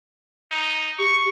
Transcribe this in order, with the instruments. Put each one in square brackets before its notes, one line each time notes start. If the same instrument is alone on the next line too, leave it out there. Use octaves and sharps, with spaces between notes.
[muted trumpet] D#4
[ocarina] G4 [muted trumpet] C#6